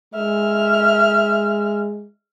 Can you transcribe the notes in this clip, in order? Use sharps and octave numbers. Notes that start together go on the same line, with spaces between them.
G#3 E5 F6